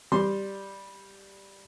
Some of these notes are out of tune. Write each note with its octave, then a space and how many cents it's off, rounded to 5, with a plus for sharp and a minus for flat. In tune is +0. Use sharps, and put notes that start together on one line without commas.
G3 +0 C6 +0